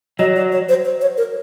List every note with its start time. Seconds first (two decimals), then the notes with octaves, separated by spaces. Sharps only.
0.19 F#3 D#5
0.36 D5
0.52 C#5
0.69 C5
0.85 C5
1.01 C#5
1.17 A#4